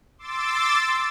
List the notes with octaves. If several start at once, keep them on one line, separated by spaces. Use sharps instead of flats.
C6 D6 E6 A6